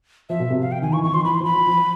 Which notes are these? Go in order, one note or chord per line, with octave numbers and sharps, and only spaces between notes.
F3 E5
B2
C3
F5
G5
D#3 G#5
E3 C#6
D#3 C#6
F3 C6
E3 B5
C6
F3 B5
F3
F3
F3